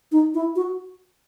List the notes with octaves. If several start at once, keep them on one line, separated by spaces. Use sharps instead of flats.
D#4
E4
F#4